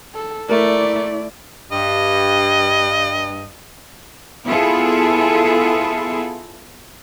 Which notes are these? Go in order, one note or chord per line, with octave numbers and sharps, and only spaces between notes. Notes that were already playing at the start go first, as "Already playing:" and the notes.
A4
A3 E4 A#4 D5
G2 D#5
B3 E4 F4 G#4 A4